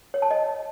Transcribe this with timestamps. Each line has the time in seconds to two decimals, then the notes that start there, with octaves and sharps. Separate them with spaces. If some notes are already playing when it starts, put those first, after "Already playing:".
0.14 C#5
0.22 A5
0.31 D#5